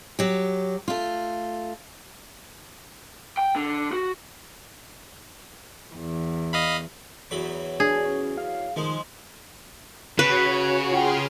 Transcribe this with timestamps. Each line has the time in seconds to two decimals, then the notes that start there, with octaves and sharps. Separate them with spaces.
0.19 F#3 G4
0.88 A3 F4
3.37 G5
3.56 D3
3.93 F#4
5.96 E2
6.53 D#5 F5 B5
7.31 E2 F#3 B5
7.80 D4 G#4
8.05 C#4
8.38 F5
8.76 D#3 F3 G#3
10.19 C#3 F#4 B4 C#5
10.92 F4 G#4 F#5 G5 C6 F6